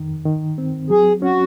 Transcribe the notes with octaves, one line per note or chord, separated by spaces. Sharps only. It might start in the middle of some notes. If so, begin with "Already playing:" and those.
Already playing: F2 D#3
D#3
C4
F#3 G#4
C#4 F#4